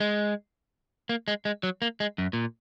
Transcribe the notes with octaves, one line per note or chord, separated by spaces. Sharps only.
G#3
A#3
G#3
G#3
F#3
A#3
G#3
F#2
A#2